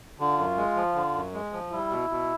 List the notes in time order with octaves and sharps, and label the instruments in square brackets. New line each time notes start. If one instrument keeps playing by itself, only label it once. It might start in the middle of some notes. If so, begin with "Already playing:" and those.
[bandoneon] D3 [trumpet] F4
[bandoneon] F#2
G#3
F3
D3
F#2
G#3
F3
[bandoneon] G3 [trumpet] E4
[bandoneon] B2
B2